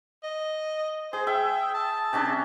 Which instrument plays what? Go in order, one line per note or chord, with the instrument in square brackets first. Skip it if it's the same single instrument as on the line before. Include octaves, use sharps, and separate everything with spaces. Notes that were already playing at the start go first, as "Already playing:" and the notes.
[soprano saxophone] D#5
[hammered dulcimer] G#4 [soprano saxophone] C5
[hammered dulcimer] E5 [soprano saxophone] G5
[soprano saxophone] A5
[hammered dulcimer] C3 C#4 D4